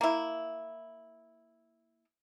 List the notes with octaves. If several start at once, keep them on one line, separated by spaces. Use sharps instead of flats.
A#3 E4